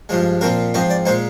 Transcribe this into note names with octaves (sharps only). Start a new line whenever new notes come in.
G2 F3 G#3
A#2 F3 C4 A#4
G#2 F3 C4 D#5
D5
A#2 G#3 D#4 C5